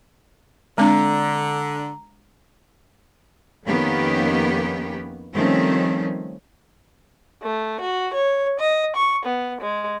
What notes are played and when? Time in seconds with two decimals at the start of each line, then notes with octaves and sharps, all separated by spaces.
0.78 D3 G#3 C4 D4 A#5
3.66 F2 D#3 A#3 B3 C#4 G4
5.34 D#3 F3 G3 A3 C4 C#4
7.44 A3
7.80 F#4
8.14 C#5
8.59 D#5
8.96 C#6
9.25 B3
9.62 G#3